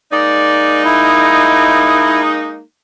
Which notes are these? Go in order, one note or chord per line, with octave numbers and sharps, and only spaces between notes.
G#3 A#3 D#4 D5
E4